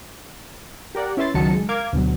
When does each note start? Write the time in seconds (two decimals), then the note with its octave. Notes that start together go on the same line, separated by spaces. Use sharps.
0.95 G4 A#4 D5 F#5
1.17 C#4 E4 B4 E5 C6 A6
1.34 C#2 D#3 F#3 A5 C#7
1.53 G#3
1.69 A#4 F5 D6 G#6
1.93 D2 B2 F#3